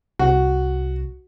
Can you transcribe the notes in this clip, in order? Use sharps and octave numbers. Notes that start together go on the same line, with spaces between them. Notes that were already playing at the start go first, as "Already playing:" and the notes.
C2 F#4